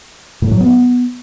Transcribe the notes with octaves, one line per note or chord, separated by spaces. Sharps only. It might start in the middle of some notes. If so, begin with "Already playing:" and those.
A2
F#3
B3